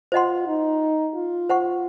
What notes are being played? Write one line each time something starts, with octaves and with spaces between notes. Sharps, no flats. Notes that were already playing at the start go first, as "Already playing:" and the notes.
F4 C5 D#5 F#5 C6
D#4
F4
C5 F#5 C#6